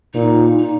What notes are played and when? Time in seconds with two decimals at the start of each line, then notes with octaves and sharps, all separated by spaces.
0.14 A#2 D#4
0.58 D#4